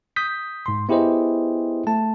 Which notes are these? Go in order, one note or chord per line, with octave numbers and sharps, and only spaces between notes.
D#6 G6 B6
G#2 C6
B3 E4 G4 G#4 C5 D#5
A3 A5